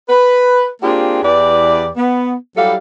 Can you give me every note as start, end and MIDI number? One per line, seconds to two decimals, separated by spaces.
0.09 0.67 71
0.82 1.22 58
0.82 1.22 60
0.82 1.22 62
0.82 1.22 65
0.82 1.22 67
0.82 1.22 68
1.23 1.89 40
1.23 1.89 52
1.23 1.89 67
1.23 1.89 71
1.23 1.89 74
1.95 2.34 59
2.57 2.75 54
2.57 2.75 55
2.57 2.75 64
2.57 2.75 67
2.57 2.75 69
2.57 2.75 77